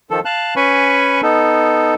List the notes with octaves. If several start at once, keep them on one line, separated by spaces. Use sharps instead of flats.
D#3 F3 A4
F5 A5 F#6
C#4 B4 G#5 B5 C#6
B3 D#4 A4